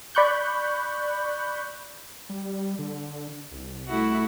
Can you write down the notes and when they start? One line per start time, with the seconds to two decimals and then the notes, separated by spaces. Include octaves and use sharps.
0.15 D5 B5 C#6 F#6 G6
2.29 G3
2.79 D3
3.51 C2
3.88 A3 E4 F#4